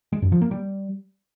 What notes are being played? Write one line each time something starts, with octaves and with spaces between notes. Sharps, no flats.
G#3
F#2
F3
A#3
G3